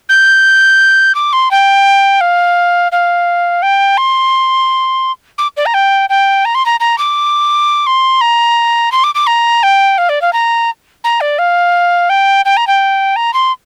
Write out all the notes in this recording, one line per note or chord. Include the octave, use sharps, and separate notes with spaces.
G6
D6
C6
G5
F5
F5
G5
C6
D6
D5
A#5
G5
G5
A#5
C6
A#5
A#5
D6
C6
A#5
C6
D6
D6
A#5
G5
F5
D5
F5
A#5
A#5
D5
F5
G5
G5
A#5
G5
A#5
C6